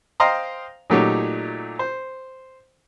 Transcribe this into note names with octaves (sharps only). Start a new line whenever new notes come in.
C5 D#5 F5 G5 A#5 C6
A#2 F#3 A3 D#4 G4 C#5
C5